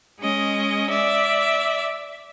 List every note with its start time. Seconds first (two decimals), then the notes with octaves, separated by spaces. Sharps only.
0.20 G#3 C#4 D#5
0.90 D5 E5